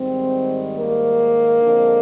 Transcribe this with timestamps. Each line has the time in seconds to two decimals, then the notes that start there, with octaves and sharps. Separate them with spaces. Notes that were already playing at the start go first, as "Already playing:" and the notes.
Already playing: G#2 D#3 G3 C4
0.76 A#3
1.61 F2 D3 G#3